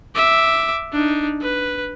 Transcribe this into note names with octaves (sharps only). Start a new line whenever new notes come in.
E5 D6
D4 D#4
B4